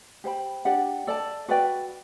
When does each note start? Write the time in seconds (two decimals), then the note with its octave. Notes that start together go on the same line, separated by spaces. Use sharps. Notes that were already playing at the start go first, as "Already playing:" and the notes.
0.24 G4 C5 G5 B5
0.65 D4 G4 D5 F#5
1.07 A4 D5 A5
1.48 F#4 B4 D5 G5